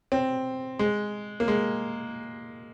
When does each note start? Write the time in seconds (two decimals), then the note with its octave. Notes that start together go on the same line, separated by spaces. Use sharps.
0.12 C4
0.79 G#3
1.40 A#3
1.48 G#3